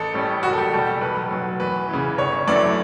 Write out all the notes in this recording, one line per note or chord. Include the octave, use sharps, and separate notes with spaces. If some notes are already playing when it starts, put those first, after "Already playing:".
Already playing: A1 A4
A2 G3 C#4
F#1 F#4
A4
G4
E2 B2 G3 G4
A4
B1 B4
B2 F#3
E2 B4
C#3 E3
G1 C#5
F#2 E3 A3 D5